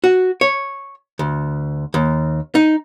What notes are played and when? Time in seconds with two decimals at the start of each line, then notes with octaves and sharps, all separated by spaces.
0.04 F#4
0.41 C#5
1.19 D2
1.94 D#2
2.55 D#4